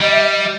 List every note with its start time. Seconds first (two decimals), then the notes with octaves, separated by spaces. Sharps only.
0.01 G3 D#5
0.12 E5
0.21 D#5